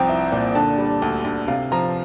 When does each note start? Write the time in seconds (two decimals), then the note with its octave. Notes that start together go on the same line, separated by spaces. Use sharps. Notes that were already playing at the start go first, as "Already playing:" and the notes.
Already playing: C2 F3 C4 G5 A#5
0.09 E4
0.32 A#2
0.55 D3 A5
0.78 G3
1.02 D2
1.24 D2
1.48 C3 F5
1.72 F3 A#5